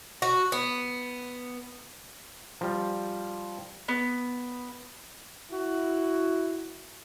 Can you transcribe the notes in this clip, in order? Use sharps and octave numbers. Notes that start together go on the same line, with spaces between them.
F#4
B3
F3 G3
B3
E4 F#4